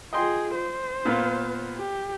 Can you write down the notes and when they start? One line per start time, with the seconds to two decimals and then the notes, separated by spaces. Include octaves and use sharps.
0.13 F4 G#4 D#5 G5 C6
0.55 C5
1.05 A#2 B3 F4
1.78 G4